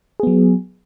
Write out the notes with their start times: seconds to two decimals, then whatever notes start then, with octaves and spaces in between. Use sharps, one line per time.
0.20 G#4
0.23 B3
0.27 F#3